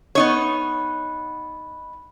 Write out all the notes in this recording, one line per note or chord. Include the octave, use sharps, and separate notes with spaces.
B3 D#4 C#5